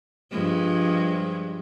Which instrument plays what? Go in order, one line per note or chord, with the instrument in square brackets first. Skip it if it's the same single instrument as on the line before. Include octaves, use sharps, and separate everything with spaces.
[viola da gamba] G2 F3 G#3